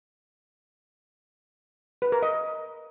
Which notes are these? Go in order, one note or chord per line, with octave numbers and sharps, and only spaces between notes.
B4
A#4
D#5